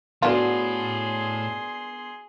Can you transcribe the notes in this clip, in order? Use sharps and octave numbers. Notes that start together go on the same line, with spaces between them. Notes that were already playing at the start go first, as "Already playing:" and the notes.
A2 D3 B3 D4 F4 F#4 G#4 C6